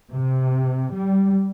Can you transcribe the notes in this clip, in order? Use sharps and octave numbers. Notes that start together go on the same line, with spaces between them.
C3
G3